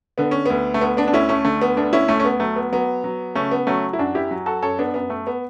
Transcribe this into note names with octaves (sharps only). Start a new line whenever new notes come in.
D3 B3
C#4
D2 B3
A3
D2 B3
B3 D4
D4
D2 C#4 E4
A3 C#4
D3 A3
B3
D2 B3 D4
C#4 E4
D2 A3 C#4
C#4
B3
F#3 A3
B3
F#3 B3
F#3
C#3 A3 C#4
B3
F#3 A3 C#4
E4
F#2 D4 F#4
E4 G4
F#3
F#4 A4
F#2 A4 C#5
B3 D4
F#2 B3
A3
B3